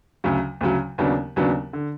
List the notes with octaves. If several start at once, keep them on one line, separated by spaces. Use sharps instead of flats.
D2 C#3 F#3
D2 C#3 F#3
D#2 C#3 F#3 B3 D4
D#2 C#3 F#3 B3 D4
D3